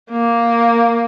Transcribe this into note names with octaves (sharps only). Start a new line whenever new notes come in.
A#3